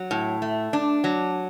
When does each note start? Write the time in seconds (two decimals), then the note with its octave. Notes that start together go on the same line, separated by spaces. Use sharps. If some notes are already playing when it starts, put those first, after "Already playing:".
Already playing: F#3
0.11 A2
0.42 A3
0.73 D4
1.04 F#3